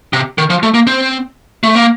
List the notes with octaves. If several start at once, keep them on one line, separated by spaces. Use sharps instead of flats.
C3
D#3
F3
A3
A#3
C4
A3
A#3